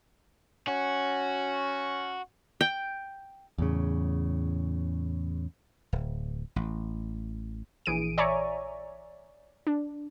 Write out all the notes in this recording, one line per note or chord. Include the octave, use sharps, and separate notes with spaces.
C#4 F#4
G5
E2 A2 C#3
D1
A1
A#1 E3 G#4 D7 D#7
C#5 D5 E5 G#5 A#5 C#6
D4